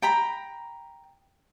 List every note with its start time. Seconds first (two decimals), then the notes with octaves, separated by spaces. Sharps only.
0.02 G5 A#5 B5